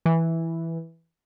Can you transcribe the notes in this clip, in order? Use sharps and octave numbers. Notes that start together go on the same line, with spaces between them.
E3